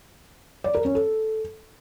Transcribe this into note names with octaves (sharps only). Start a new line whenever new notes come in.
D5
A#4
C#4
A4